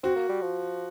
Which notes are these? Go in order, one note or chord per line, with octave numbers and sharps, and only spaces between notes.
C4 F#4
A#3
G3
F3